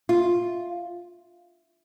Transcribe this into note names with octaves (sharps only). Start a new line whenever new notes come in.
F4